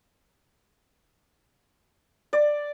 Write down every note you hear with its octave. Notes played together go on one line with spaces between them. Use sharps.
D5